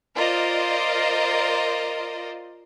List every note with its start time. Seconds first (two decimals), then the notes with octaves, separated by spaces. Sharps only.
0.15 F4 A#4 C5 D5 D#5